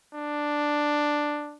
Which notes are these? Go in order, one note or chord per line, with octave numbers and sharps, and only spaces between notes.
D4